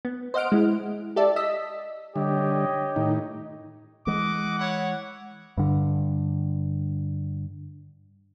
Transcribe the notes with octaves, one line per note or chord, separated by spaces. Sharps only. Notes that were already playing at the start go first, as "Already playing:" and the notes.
B3
C5 D#5 F#5 F6 D7
G#3 E4
G4 A4 D5 E5 A5
D#5 E6 B6
D3 G3 G4 C#5 D#5
A2 D#3 D#4
E3 G#3 D#5 F#5 D6
E4 C#5 F#5
G2 D3